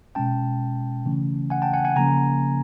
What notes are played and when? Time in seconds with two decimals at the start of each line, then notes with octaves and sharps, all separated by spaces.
0.15 B2 G#3 C#4 G5 A5
1.06 C#3 E3 A3 C#4
1.50 F#5 G#5
1.62 G5 A5
1.73 F#5 G#5
1.85 F#5 G#5
1.96 C#3 F3 A#3 C#4 G#5 A#5